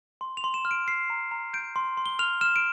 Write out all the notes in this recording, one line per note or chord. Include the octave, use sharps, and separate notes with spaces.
C6
F7
C6
E7
F6
D7
F6 C7
A#5
A#5
G6 D7
C6
C6
G7
F6 F7
F6 E7
D7